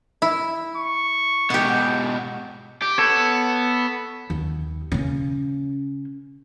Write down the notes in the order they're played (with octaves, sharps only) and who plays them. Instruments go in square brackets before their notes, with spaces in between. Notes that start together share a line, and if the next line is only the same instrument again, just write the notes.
[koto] E4
[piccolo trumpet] C#6
[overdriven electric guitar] G#2 B2 [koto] G4 F#5
[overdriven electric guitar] G4
[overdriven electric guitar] B3 [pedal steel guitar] A4 C#5
[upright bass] D#2
C#3 C#4